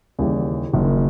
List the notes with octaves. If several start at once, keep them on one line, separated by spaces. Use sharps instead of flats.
D#2 C#3 E3 G3
F#1 F#2 D#3